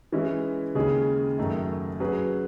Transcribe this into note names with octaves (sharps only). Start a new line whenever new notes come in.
E3 G#3 C#4 E4
D#2 C#3 G#3 C#4 G#4
F#2 D#3 A3 D#4
F#3 C#4 G#4 B4